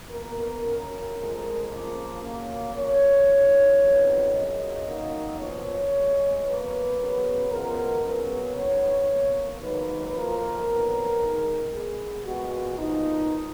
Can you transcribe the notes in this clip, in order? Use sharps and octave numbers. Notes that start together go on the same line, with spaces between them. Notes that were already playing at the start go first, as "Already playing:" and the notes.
B2 A#3 A#4
F#2 C#3 F#3
F2 F3 G#3
C#3 F3 A#3
F#2 C#3 F#3 A#3
F2 C#3 F3 C#5
F#2 D#3 G#3
F2 D#3 F#3 B3
F#2 C#3 F#3 D#5
F#2 D#3 F#3 A#3
A#2 F3 B3 C#5
F2 C#3 G#3
B2 F#3 A#3 B4
C#3 F#3 B3
F#2 F3 G#3 B3 A#4
C#3 F#3 B3
G#2 F#3 B3 C#5
B2 F#3 A#3
G#2 D#3 F#3 A#3 B4
F2 F3 A#3 A#4
F2 D#3 F#3 B3
G#2 D#3 G#3
B2 G#3 B3 G#4
A#2 G#3 B3 F#4
A#2 F3 B3 D#4